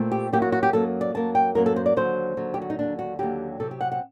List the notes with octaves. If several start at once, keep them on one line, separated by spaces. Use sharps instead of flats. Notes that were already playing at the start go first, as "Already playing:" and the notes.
Already playing: A#2 A3 C4
G4
F#2 F#3 A#3 G4
F#4
F#4
G4
F#2 F#3 A#3 A4
D5
F#2 F#3 A#3 A5
G5
F#2 F#3 A#3 A#4
A4
C5
D5
D#2 D3 F#3 C5
D#2 D3 F#3
G4
F#4
D#4
D#2 D3 F#3 D4
F#4
D#2 D3 F#3 G4
C3 F#3 C4 A4
G4
F#5
F#5